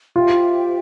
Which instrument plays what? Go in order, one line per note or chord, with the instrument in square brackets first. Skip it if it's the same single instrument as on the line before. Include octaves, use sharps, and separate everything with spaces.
[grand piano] F4 [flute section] G4 C5 E5 G5